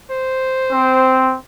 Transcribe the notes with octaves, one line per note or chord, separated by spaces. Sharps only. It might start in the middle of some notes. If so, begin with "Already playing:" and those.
C5
C4